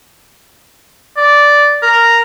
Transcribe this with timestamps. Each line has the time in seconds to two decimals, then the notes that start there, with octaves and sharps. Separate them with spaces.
1.17 D5
1.83 A#4